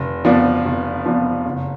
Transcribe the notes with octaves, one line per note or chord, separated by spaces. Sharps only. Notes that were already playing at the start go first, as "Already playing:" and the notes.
Already playing: F1
F2 F3 B3 D4
F1
F2 F3 B3 D4
F#1